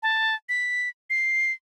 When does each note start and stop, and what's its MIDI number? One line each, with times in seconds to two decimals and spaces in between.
0.03 0.35 81
0.49 0.89 95
1.10 1.52 96